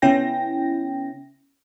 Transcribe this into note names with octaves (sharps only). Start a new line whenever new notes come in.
C#3 B3 C#4 E4 G5 A#6